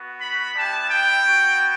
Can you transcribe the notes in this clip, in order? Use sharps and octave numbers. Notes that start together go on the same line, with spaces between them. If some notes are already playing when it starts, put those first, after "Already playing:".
Already playing: B3 F#4
B5
G3 B3 E4 G4 A5
G5
B3 F#4